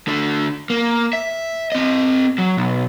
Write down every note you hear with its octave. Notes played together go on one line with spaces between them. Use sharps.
D3 A3
A#3
E5
C4 D#5
F#3
B1